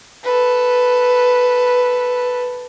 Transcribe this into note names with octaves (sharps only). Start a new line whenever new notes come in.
A4 B4